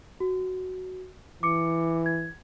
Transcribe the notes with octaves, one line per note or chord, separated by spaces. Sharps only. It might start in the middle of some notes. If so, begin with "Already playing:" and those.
F#4
E3 D6 C#7
G#6